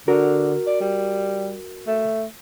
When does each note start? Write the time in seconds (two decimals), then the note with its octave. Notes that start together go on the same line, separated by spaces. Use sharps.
0.08 D3 F#4 A#4
0.67 D5
0.81 G3
1.87 A3